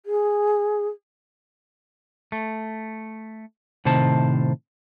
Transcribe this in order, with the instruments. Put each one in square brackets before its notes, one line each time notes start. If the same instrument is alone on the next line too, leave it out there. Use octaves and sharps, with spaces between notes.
[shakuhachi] G#4
[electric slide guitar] A3
A2 C3 D#3 C5 A5